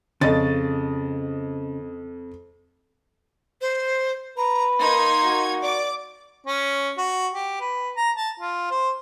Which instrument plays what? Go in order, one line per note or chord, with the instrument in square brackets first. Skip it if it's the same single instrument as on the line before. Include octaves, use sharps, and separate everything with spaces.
[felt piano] F2 D#5 A6 [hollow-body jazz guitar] C#3
[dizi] C5
[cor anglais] B4 [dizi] A#5
[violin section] A#3 D#4 G#6 [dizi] C6
[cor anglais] F#4
[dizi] D5 [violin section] D6
[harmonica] C#4
F#4
G4
B4
A#5
A5
F4
C5